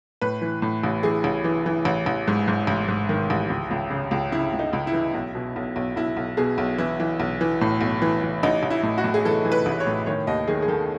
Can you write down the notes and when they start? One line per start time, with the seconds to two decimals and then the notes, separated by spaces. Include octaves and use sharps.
0.22 A2 B4
0.42 E3
0.62 A2
0.84 A1
1.03 E3 G#4
1.24 A1
1.44 E3
1.66 E3
1.85 A1
2.06 A1
2.27 G#2
2.48 G#2
2.67 A1
2.88 G#2
3.09 D#3
3.30 A1
3.49 C#2
3.71 C#2
3.91 C#3
4.11 C#2
4.32 C#3 E4
4.53 C#2
4.59 D#4
4.73 C#2
4.87 E4
4.93 E3
5.14 B1
5.35 B2
5.56 B1
5.76 B1
5.96 B1 E4
6.17 B1
6.37 B2 G#4
6.58 B1
6.78 E3 E4
7.00 E3
7.20 B1
7.41 E3
7.61 A2
7.81 B1
8.02 E3
8.22 E3
8.43 A1 D#4
8.63 A1
8.70 E4
8.83 A2
8.98 F#4
9.04 A2
9.14 G#4
9.25 E3 A4
9.45 E3
9.52 B4
9.66 A1
9.80 C#5
9.87 A2
10.06 D#3 C#5
10.27 D#2 D#5
10.47 D#3 G#4
10.62 G#4
10.68 D#3 A4